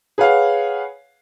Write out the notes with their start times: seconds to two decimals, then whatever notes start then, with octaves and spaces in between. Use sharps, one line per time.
0.18 G#4 B4 C#5 F5 F#5